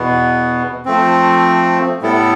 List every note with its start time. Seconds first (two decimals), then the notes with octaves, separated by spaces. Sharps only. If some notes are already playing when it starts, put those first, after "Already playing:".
Already playing: E2 B2 B3
0.86 F3 A3 C4
2.02 A2 G3 B3 E4 A4